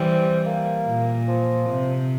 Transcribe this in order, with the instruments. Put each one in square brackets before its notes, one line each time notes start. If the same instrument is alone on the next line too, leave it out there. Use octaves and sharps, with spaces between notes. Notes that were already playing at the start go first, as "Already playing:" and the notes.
Already playing: [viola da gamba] E3 G3 [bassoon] C4
[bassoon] A#3
[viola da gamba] A#2
[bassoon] F3
[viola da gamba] C3